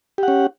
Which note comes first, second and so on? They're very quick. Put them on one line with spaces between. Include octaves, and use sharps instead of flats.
G4 F#5 C#4